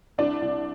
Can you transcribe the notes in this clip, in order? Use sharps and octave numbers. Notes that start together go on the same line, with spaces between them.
C2 D4 D5
C2